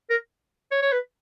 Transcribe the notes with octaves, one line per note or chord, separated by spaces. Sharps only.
A#4
C#5
C#5
B4